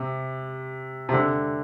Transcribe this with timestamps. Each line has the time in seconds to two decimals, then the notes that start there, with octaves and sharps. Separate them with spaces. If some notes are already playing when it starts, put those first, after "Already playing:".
Already playing: C3
1.09 C3
1.14 D3